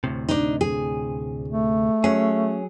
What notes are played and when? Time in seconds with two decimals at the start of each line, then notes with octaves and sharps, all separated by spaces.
0.04 D2 A2 C3
0.28 D4 D#4
0.61 G#4
1.48 A3
2.04 F#3 C#4 G#4